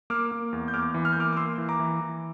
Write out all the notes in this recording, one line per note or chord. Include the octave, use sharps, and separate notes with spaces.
A#3 D6 F6
A#3
E2
G6
E2 D6 F6
E3
F6
G6
A#3 D6 F6
D6
A#3 C6 E6
E3
A#5 D6
E3
E3